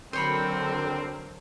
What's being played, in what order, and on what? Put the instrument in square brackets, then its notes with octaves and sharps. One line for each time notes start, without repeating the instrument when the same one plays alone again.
[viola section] D3 F#3 A#4 [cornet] C4 [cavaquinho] C5 C#5 B5